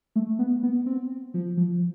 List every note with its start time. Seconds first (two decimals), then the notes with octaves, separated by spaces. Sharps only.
0.16 A3
0.39 B3
0.63 B3
0.86 C4
1.34 F3
1.57 F3